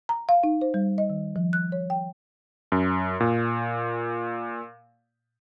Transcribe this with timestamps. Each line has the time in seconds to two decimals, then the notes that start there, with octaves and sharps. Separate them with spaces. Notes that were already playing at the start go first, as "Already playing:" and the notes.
0.09 A#5
0.29 F5
0.44 D#4
0.61 C5
0.74 G3
0.98 D#5
1.10 D#3
1.36 F3
1.53 F#6
1.72 C#5
1.90 G5
2.72 F#2
3.20 A#2